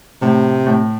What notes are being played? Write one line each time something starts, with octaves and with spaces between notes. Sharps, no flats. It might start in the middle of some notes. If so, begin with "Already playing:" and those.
A2 C3
A2